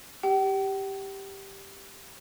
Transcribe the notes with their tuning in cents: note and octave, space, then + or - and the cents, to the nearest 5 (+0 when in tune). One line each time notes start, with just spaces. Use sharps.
G4 +0 G5 -45